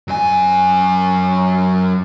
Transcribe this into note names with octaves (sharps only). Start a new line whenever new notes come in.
F#2 G#5